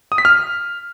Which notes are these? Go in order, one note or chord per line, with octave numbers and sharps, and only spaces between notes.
D#6
B6
F6